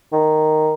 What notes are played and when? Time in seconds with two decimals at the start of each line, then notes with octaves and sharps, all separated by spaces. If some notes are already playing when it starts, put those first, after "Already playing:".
0.13 D#3